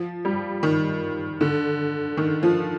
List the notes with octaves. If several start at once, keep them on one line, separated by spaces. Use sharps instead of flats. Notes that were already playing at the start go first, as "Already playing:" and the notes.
Already playing: F3
G3
D#3
D3
D#3
F3